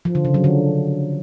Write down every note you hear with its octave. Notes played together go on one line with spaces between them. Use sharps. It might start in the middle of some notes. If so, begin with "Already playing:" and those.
F3
D3
C#3
F#3
D3